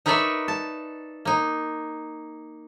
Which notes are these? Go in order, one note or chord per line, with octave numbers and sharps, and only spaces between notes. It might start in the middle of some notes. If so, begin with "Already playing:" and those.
D#4 A#4 B4 C#5 D5 E5
A5
A#3 D#4